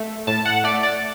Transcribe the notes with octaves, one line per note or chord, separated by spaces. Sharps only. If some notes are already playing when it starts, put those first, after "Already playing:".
Already playing: A3
A2 A5
F#5
A3 D5
D5